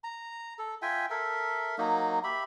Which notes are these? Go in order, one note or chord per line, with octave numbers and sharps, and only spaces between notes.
A#5
A4
F4 E5 G5 G#5
A4 A#4 E5
F#3 A#3 D#4
G4 E5 B5